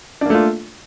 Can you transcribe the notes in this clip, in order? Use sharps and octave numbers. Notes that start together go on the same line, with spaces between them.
A3 A#3 D4 F4